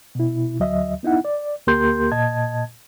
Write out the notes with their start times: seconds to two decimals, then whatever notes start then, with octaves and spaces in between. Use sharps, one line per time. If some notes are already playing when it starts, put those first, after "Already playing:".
0.15 B2 E4
0.59 D2 F#3 D#5 E5
1.03 B3 D#4 E4 F#5
1.25 D5
1.67 D2 A#3 G4 A#4 C6 G6
2.12 A#2 D#5 A5 G#6